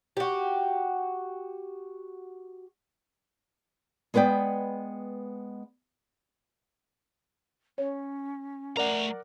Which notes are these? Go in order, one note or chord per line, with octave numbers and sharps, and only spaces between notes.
F#4 G4
G#3 B3 B4 D5 G5
C#4 C#5
A3 A#4 D5 F#5 A#5